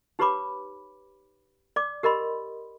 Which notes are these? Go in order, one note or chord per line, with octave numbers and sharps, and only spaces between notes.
D#4 G4 B4 C#5 B5 D6
D5 D6
G4 A#4 D#5 B5 C6